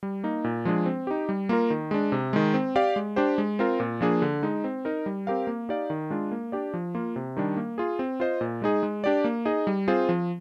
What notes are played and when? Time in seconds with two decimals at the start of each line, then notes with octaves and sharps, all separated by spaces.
0.03 G3
0.24 A#3 D#4
0.44 A#2
0.65 F3 G#3 D4 G#4
0.86 C4
1.07 D#4 G4
1.29 G3
1.49 A#3 F4 A#4
1.70 D#3
1.91 G#3 D4
2.12 C3
2.33 D#3 G#3
2.54 C4
2.76 G4 D5 F5
2.96 G#3
3.16 D4 G4 C5
3.38 G#3
3.59 C4 F4 A#4
3.80 A#2
4.01 F3 A#3 D4 G#4
4.22 D3
4.43 G#3 D#4
4.64 C4
4.85 D#4 A#4
5.06 G3
5.27 C4 G4 A#4 F5
5.47 A#3
5.69 D#4 G4 D5 F5
5.90 D#3
6.10 G#3 D4 F4
6.31 A#3
6.52 D4 G4 D5
6.74 F3
6.95 A#3 F4
7.16 C3
7.37 D#3 G3 D4
7.57 A#3
7.78 F4 G#4
7.99 C4
8.20 F4 C5 D#5
8.41 A#2
8.62 G#3 D#4 G#4
8.83 G#3
9.04 D4 G4 D5
9.24 A#3
9.45 D#4 G#4 D#5
9.67 G3
9.88 C4 F4 G#4 C5
10.09 F3